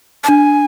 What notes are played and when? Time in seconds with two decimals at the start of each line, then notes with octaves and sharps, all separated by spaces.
0.24 A5
0.29 D4 G#5